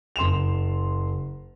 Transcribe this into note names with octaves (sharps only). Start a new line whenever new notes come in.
F#1 C6 E7 F7